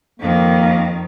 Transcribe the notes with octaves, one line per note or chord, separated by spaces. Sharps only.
F2 D#3 A#3